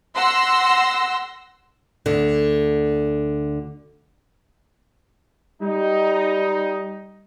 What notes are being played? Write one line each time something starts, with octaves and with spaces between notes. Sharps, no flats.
F#5 C6 E6 A#6
D2 D3
G3 D#4